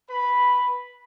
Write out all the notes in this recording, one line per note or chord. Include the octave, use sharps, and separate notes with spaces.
B4 B5